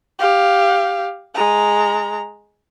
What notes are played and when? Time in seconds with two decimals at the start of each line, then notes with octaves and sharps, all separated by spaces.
0.19 G4 F5
1.34 G#3 A#5